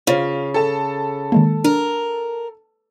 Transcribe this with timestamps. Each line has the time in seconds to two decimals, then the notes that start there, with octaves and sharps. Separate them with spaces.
0.07 C#3 F4 C5 C#5
0.54 A4 A5
1.32 D#3 G#3 A#3
1.64 D4 A#4